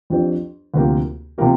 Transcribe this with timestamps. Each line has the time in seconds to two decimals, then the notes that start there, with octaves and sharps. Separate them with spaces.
0.10 F2 F3 D4 G4 C5
0.74 D2 C3 F3 A#3 G4
1.38 C3 F3 A#3 G4